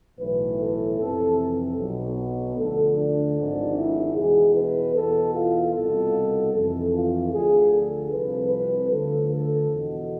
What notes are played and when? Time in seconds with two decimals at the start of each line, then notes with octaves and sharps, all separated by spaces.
0.19 B1 A2 E3 B4
0.58 A4
0.98 F2 C3 E3 A4
1.77 B1 B2
2.56 D2 D3 F3 A4
2.97 D4
3.35 G#1 G#2 F3
3.75 E4
4.16 E2 B2 G#4
4.54 B4
4.94 E2 B2 A4
5.33 F4
5.73 C2 B2 A4
6.53 F2 E3 A4
6.93 F4
7.32 D2 D3 F3 G#4
7.71 A4
8.11 C2 C3 F3 B4
8.51 B4
8.90 D2 D3 F3 A4
9.30 A4
9.69 E2 B2